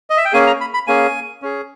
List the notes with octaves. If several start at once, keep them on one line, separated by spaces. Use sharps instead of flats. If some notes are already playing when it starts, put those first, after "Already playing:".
D#5
E5
G5
A#3 C#4 G#4 G#5
A#5
B5
B5
A#3 C#4 G#4 G#5
C#4 G#4